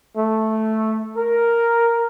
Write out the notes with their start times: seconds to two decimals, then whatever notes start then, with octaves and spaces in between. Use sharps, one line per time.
0.16 A3
1.17 A#4